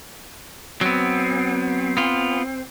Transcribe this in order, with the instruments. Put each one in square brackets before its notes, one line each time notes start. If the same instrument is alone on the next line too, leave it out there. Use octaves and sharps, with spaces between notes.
[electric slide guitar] F#3 B3 [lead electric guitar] C4
[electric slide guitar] B3 F4